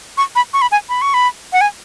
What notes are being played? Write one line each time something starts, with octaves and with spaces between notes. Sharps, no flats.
C#6
B5
C#6
B5
G#5
B5
C#6
B5
F#5
G#5